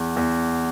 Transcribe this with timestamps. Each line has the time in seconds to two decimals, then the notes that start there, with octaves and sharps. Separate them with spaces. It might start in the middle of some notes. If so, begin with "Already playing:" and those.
Already playing: E2
0.16 E2